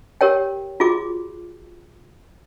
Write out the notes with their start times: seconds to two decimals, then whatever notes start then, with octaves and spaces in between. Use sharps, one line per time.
0.21 G4 A#4 C#5 G5
0.80 F4 F#4 G#4 D6